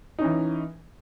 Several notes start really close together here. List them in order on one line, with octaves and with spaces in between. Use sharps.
D#4 C#4 E3